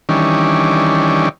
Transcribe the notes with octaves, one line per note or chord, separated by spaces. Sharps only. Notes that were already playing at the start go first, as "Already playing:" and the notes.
D#3 E3 G3 C#4 D4